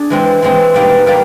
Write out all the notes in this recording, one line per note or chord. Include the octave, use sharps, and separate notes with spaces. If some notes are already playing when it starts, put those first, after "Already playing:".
Already playing: D4 G#4
E3 G#3 C4
E3 G#3 C4
B2 G3 A#3 D#4
B2 G3 A#3